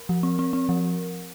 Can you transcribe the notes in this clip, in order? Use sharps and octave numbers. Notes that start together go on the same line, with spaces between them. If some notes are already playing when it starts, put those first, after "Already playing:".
Already playing: A#4
F3
C4
C4
C4
F3